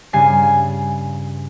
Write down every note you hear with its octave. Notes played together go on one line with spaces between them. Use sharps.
G2 C#3 G#5 A6 C7